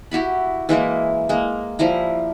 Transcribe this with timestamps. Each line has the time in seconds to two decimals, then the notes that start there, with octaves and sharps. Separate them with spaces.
0.11 E4 F#4 G4 B5
0.69 E3 G#3 A#3 E4
1.29 G#3 A#3
1.79 F3 G3 E4 A#5